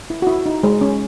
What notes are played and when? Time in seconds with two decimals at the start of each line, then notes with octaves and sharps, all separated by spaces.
0.10 E4
0.22 F#4
0.27 E4
0.46 D#4
0.63 G#3
0.81 C#4